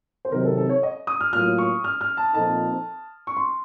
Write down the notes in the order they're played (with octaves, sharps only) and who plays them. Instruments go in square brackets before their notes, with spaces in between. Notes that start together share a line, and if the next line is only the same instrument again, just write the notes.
[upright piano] C5
[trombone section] C3 D#3 F#3 C4 D#4 [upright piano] A#4
[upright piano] A4
A4
C#5
D#5
D#6
F6
[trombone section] A2 F#3 A#3 F4 [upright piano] F6
[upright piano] C#6
F6
F6
A5
[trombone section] A#2 F3 C4 D#4 A4 [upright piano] A5
[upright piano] C#6
C6